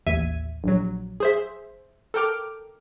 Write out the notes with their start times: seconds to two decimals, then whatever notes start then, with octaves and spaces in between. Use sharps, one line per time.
0.06 A1 D#2 E5 G#6 D#7
0.64 A#1 F#3
1.20 G#4 C5 E5
2.14 A4 A#4 G5 D6 F6